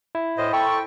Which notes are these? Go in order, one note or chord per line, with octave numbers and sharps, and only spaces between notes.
E4
D2 A2 C5 D#5
A4 C5 G5 B5 C#6